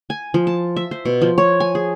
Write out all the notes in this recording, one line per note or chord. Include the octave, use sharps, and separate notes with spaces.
G#5
F3
A5
E5
C5
B2
F3
C#5
G#5
G#4